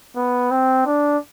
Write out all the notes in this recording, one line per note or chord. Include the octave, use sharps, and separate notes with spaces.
B3
C4
D4